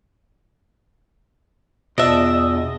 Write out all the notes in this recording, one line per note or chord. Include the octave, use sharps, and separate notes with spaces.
E2 B2 D4 F4 D#5 E5